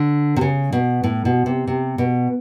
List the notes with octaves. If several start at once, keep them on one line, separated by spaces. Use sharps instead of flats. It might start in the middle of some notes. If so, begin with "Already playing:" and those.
Already playing: D3
C3
C#3
B2
A2
B2
C3
C3
B2